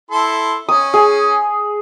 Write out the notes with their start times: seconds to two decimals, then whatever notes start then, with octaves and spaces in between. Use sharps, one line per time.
0.11 E4 A4 C6
0.69 C#4 D#6
0.94 G#4